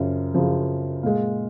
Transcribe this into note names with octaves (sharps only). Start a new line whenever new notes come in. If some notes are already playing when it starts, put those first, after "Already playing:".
Already playing: F#2 C#3 F3
F#2 C#3 F3
A#2 G#3 F5